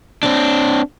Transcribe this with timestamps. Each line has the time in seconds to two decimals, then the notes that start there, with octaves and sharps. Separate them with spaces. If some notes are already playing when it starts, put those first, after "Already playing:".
0.23 C4 D4